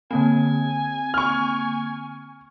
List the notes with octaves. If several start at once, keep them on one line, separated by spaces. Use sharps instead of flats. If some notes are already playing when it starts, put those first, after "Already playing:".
D3 A#3 C4 G#5
C#6 F6